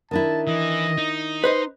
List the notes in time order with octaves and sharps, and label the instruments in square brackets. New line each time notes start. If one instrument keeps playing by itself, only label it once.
[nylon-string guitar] D#3 D4 E4 [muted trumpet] A5
[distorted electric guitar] E3 [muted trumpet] D#5
[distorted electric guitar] D#4
[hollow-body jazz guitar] B4 C5 D#5 [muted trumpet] C6